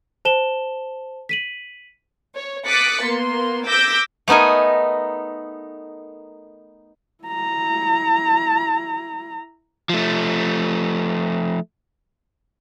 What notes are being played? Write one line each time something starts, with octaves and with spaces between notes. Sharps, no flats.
C5 A5 E7 G7
B6 D#7 F#7
C#5
D6 D#6 F#6 A6 B6 C#7
A#3 B3 C6
D6 E6 G6 A#6 B6 D7
A3 B3 D#4 A#4 G#5
E4 A#5
F3 A3